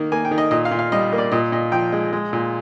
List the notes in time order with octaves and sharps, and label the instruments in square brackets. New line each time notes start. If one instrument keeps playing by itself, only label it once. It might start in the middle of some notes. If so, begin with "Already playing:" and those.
Already playing: [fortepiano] D#3 A#3
A#3 G#5
G5
D#3
D#5
A#2 D#5
F5
A#2
F5
G3 D#5
A#3
D5
A#2 D#5
A#2 D#5
F3 G5
G#3
G#3
A#2